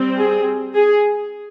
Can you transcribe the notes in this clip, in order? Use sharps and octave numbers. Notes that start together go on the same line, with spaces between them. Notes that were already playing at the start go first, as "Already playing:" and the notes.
Already playing: G3 C4
G#4
G#4